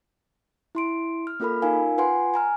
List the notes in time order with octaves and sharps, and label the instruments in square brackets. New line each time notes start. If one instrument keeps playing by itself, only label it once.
[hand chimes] E4 C6 D7
F6
A#3 C#4 F4 A4 A#4 B5
D#4 F4 A#4 F5 G#5
F4 B4 F#5 G#5 C6
G#5 A#5 F6